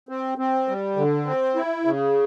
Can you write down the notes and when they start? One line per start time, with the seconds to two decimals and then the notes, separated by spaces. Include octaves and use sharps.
0.09 C4
0.38 C4
0.68 G3
0.97 D3
1.26 C4
1.56 E4
1.85 C#3